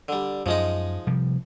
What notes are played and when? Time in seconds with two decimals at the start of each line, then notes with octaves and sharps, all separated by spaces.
0.08 D3 G3
0.46 F#2 F3 G#3 D#4
1.07 C3 F3 G3